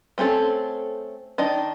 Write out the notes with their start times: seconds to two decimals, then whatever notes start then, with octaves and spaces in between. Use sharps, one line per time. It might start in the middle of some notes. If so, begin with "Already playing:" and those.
0.18 A3 C4 C#4 A4
1.38 D#3 D4 D#5